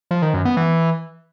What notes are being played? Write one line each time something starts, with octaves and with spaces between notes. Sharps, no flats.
F3
D#3
F#2
B3
E3